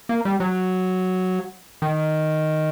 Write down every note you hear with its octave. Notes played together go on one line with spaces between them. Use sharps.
A#3
G3
F#3
D#3